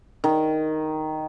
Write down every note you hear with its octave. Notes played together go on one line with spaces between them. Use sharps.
D#3